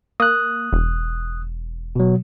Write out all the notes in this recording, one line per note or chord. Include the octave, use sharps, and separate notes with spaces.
A#3 D#6 F#6
E1
B2 F#3